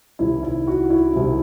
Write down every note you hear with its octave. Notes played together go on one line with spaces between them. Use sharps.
C2 C3 D#3 E4
E4
F#4
E4
C2 C3 D#3